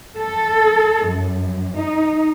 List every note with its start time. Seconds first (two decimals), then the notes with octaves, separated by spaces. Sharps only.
0.19 A4
1.08 F#2
1.77 D#4